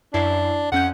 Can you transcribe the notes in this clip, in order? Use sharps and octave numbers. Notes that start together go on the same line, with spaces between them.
F#2 D4 E4 C7
F2 C#4 F#5 G6